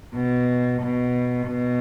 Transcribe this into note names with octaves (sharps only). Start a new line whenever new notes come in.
B2
B2
B2